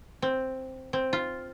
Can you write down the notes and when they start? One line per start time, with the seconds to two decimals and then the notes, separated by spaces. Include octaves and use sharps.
0.22 C4
0.93 C4
1.13 F4